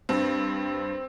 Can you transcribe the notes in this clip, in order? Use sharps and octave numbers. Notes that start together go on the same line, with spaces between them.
G2 C4